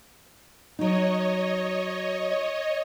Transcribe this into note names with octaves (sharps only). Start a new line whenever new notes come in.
F#3 D#4 C#5 D#5